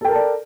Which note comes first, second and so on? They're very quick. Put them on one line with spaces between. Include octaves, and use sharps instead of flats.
A4 G5 A#4 A5 D5